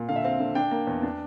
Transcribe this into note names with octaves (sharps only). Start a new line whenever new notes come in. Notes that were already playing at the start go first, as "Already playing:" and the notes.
Already playing: A#2
D3 F5
E5
C4 F5
D3
D4 G5
A#3
E2
D4